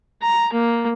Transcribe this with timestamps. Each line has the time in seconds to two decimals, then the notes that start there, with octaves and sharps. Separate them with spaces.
0.22 A#5
0.53 A#3